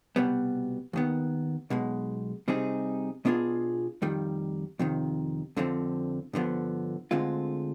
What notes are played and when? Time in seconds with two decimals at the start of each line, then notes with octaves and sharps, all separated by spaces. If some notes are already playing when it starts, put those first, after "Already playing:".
0.16 C2 B2 G3 B3
0.93 D#2 D#3 B3
1.70 B1 B2 G#3
2.48 C3 G3 C4 D#4 G#4
3.25 B2 B3 D4 F4 G#4
4.02 F2 D#3 G3
4.79 F2 C3 D#3
5.57 F2 D3 F3 C4
6.33 G2 D3 F3 B3
7.11 D2 D3 G#3 C4 F4